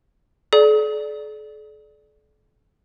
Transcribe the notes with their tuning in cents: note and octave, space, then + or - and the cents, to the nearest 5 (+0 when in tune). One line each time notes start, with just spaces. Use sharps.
A4 -45 D5 +0